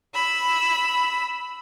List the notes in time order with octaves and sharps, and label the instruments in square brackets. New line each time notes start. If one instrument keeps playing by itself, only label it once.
[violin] B5 E6